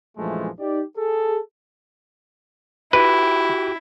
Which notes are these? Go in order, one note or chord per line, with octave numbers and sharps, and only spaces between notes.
A#1 F#2 E3 F3 G#3 A3
D#4 G4 D5
G#4 A4
E4 F#4 G4 B4 B5